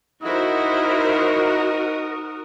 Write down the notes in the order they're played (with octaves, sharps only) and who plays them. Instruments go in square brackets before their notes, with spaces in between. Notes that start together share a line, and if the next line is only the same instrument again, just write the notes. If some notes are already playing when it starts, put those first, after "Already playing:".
[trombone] D#4 [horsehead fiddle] E4 C5 [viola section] F#4 A#4 [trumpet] D#6